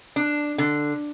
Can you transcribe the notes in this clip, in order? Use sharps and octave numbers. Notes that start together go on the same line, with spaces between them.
D4
D3